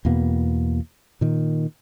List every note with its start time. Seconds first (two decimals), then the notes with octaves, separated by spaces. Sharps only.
0.05 E2 B2 A#3 B3
1.21 A#2 D#3